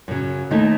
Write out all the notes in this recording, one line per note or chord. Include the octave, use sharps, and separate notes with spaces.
F#2 C#3 F#3
D#2 D#3 A3 D#4